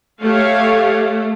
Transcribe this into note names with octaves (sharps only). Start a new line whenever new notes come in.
A3 G4 C#5 F5